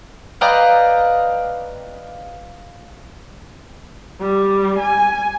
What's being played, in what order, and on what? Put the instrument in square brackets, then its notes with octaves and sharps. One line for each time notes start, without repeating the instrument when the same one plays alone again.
[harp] B4 D5 D#5 F5 G5 A#5
[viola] G3
G#5